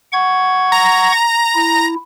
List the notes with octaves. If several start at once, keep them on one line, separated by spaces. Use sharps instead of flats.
F#5 C#6 G#6
A#5
E4